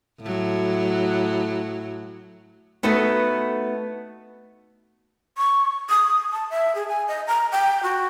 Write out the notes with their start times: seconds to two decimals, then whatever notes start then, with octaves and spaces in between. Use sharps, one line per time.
0.21 A2 F#3
2.83 A3 B3 D#4 F#4 A4 B4
5.38 C#6
5.90 D#6
6.33 A5
6.50 E5
6.75 G#4
6.88 G#5
7.08 D#5
7.27 A#5
7.52 G5
7.83 F#4